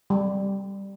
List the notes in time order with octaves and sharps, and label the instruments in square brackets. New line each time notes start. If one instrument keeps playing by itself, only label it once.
[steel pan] G3